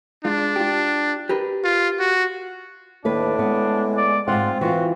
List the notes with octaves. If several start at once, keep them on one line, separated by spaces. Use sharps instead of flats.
G#3 D4 F4
F4 G4
G4 A#4 B4
F4
F#4
D#2 A2 D4 B4
G#3 B3
D5
G#2 E3 C4 F4 F#5
E3 F4 F#4